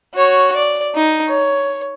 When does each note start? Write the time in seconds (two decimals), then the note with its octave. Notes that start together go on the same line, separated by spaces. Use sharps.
0.14 F#4 C#5
0.56 D5
0.95 D#4
1.28 C#5